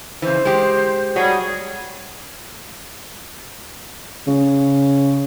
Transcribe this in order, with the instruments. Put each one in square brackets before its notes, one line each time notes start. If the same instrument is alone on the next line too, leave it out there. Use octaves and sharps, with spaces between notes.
[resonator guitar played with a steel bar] C#3 E3 [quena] C5
[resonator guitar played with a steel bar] G#3 G4
[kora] F#3 [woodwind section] G3 G#4
[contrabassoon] C#3